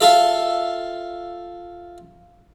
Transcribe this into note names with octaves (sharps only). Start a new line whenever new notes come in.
F4 A4 E5